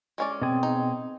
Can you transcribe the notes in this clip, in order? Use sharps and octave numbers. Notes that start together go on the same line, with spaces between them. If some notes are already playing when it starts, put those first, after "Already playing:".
G#3 C#4 D5
B2 C4 G#4
D#4